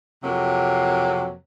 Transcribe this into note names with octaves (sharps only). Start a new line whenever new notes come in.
F2 C3 F#3 A#3